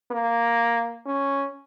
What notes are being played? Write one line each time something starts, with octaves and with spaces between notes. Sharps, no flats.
A#3
C#4